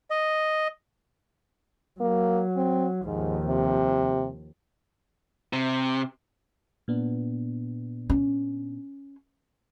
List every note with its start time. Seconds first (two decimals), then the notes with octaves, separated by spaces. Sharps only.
0.10 D#5
2.00 F#3 A#3
2.56 C4
3.05 D#2 G#2 F3
3.48 C3
5.53 C3
6.88 A#2 B3 D4
8.10 C#4